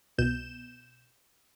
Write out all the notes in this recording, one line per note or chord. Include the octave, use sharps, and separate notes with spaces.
C2 B2 G6 E7